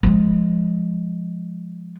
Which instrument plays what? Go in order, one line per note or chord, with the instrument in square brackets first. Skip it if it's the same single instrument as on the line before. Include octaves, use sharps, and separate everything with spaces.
[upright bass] F3 G#3